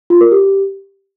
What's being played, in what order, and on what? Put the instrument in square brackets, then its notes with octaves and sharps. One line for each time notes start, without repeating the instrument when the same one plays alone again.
[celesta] F4
A#4
G4